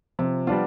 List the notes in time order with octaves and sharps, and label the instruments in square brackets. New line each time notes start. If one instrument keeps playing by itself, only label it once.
[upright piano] C3 [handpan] F3
[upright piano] G3 D4 F4 [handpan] B3